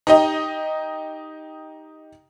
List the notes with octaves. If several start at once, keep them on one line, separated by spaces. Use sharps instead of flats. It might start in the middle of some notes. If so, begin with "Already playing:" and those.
D#4 G4 D#5